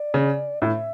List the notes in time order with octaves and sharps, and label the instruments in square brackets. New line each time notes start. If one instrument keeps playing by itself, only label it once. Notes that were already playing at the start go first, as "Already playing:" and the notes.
Already playing: [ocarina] D5
[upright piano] C#3
[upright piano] A2 [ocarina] E5